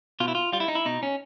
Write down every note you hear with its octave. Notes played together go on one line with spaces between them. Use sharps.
B2 F4
E4
F4
G3 F4
E4
D#4
E4
B2 D#4
C#4